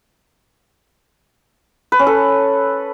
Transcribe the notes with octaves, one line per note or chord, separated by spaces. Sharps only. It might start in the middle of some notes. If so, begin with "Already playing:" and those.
B4
C#4
A4